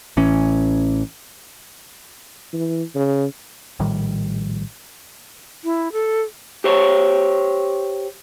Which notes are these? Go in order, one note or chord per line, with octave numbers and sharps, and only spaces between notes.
A1 E3 C#4
E3
C#3
A#1 A2 D#3 G3
E4
A4
G4 C5 C#5